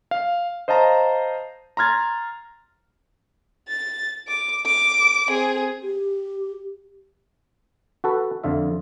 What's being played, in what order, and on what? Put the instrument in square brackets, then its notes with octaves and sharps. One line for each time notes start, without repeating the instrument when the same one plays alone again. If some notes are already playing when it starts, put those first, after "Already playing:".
[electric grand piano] F5
C5 D#5 F5 A5 A#5
A#5 C6 F6 G#6 A6
[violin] A6
D6
D6
C4 G#4
[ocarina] G4
[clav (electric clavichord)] F#4 A4 B4
F2 D3 F4 E5